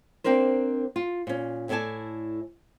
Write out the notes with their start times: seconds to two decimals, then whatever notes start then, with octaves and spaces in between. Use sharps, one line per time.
0.24 A#3 C4 D4 A#4 C5
0.96 F4
1.27 A#2 C#4
1.69 A2 E4 A4 D5 G#5 A5